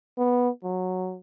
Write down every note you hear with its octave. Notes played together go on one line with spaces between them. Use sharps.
B3
F#3